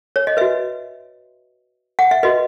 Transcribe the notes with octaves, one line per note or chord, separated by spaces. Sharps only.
C#5
D#5
F#4 B4 E5
F#5
E5
F#4 B4 D#5